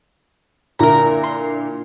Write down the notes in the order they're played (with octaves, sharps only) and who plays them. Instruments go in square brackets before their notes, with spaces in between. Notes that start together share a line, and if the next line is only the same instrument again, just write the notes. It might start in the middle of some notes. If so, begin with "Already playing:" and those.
[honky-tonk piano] A#2 D3 E4 [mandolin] A#4 A#5
[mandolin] C6